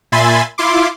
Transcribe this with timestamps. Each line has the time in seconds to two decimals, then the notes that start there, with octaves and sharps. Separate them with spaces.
0.12 A#2 E5 G#5 B5 C6 A6
0.58 E4 F4 C6 D6